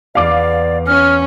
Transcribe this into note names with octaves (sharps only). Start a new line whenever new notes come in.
E2 B3 D5 F5 D6
C#4 F6